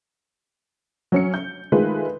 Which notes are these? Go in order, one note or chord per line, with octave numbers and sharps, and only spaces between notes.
F#3 C#4 C#7
G6
D#3 G#3 A3 F4 B4